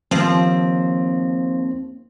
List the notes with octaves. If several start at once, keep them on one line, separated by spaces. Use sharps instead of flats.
D#2 F3 C4